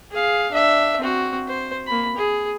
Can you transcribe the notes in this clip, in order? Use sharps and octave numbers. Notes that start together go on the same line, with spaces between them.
G#4 F5
D4 E5
C4 F#4
C5
A#3 B5
G#4